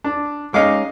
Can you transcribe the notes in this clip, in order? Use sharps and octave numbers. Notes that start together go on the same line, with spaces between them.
D4
G#3 C#4 D#4 D#5 F5 D6